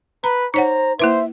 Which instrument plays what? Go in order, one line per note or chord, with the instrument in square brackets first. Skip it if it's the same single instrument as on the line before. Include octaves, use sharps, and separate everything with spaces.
[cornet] B4 [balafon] A#5
[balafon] D#4 C#5 F#5 [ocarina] C5 [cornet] A#5
[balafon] A#3 E4 B4 [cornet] C5 [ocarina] E5